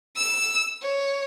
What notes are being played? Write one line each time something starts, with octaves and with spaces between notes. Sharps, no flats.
E6
C#5